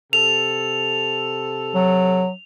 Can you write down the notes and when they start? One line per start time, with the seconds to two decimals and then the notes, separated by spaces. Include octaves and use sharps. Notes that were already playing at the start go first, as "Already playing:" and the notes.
0.13 C3 A4 F7
1.75 F#3